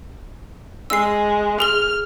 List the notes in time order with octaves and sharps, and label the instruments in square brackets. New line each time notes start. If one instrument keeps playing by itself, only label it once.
[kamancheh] G#3 [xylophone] E6 C7
[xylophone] G#4 G7 [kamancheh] F6